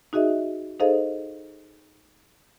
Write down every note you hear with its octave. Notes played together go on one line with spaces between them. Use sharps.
D#4 F#4 G#4 D#5 E5
D#4 G#4 A4 C5 D#5 F5